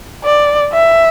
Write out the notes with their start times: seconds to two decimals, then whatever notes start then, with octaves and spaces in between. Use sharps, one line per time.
0.24 D5
0.73 E5